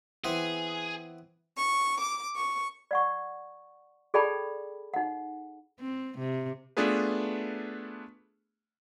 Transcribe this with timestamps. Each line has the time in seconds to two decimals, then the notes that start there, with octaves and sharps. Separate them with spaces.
0.24 E3 B3 C4 G#4
1.56 C#6
2.00 D6
2.36 C#6
2.91 D5 F#5 C#6
4.14 G#4 A4 D5 G5 A5 B5
4.94 D#4 F#5
5.80 C4
6.18 C3
6.77 A3 B3 D4 F4 G#4 B4